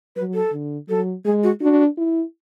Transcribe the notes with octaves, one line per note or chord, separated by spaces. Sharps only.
F#3 B4
A4
D3
F#3 A4
G#3 G#4
F#4
D4 F#4
E4